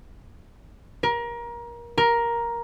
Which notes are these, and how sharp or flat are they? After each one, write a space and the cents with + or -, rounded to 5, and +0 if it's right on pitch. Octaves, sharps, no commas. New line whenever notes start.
A#4 +25
A#4 +10